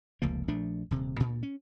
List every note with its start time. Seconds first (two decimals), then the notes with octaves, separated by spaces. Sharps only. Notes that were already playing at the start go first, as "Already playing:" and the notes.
0.22 F1 C#2 F3 A#3
0.48 A#1 F3 A3 D4
0.91 D#1 C3
1.17 D2 A#2
1.43 C#4